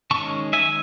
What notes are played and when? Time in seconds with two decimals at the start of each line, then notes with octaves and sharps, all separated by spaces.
0.11 D#3 G#3 C#4 A5 C#6
0.53 E5 G#5